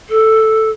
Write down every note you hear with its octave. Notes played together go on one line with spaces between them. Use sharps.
A4